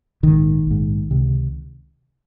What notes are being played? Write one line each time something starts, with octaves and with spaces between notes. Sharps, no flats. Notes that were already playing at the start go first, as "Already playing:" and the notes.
A#1 G#2 D#3
A#1 G#2
C#2 C3